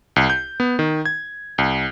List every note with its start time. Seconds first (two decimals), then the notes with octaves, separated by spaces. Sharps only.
0.16 C2
0.30 G6
0.60 B3
0.79 D#3
1.06 G#6
1.58 C2